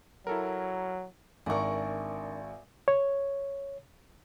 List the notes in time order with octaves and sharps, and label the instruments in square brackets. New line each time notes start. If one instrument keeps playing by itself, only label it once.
[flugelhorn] F#3 [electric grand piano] E4 A4 A#4
[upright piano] G#1 C#6 [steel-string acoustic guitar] D4 A#4 [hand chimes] E5 G#5
[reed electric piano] C#5